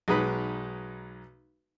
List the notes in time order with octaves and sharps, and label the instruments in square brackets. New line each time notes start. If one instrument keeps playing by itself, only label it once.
[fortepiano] B1 G#3 D#4 B4 B5